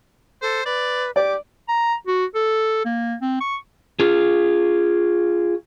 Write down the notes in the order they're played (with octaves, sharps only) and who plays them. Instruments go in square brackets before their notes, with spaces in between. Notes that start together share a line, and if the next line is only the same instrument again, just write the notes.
[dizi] A4 [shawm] C5
[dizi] B4 [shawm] D5
[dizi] G4 [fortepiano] D5 [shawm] D6
[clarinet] A#5
F#4
A4
A#3
C4
C#6
[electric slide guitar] F4 G#4